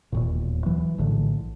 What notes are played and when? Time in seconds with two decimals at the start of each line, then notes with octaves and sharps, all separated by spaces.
0.12 E1 D#2 A#2
0.66 E3 F#3
0.98 A#1 A2 D3 E3